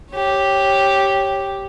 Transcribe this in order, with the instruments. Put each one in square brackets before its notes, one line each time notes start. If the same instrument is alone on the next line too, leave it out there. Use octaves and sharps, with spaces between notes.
[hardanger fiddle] G4 C#5